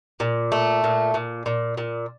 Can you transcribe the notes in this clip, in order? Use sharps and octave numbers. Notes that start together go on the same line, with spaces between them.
A#2
A3
A#2
A#2
A#2
A#2